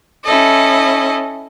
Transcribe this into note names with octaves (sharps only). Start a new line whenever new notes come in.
C#4 E4 A4 D#5